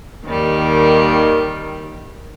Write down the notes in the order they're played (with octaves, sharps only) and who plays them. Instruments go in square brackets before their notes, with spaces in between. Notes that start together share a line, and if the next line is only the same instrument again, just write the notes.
[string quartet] D#2 D#3 G3